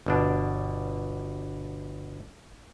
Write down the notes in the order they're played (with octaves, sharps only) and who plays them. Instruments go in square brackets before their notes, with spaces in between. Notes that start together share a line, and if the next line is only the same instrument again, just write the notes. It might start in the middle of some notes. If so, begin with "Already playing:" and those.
[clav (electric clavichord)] G1 B2 D4